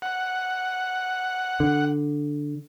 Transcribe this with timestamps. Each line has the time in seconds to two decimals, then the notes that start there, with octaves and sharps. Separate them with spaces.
0.02 F#5
1.60 D3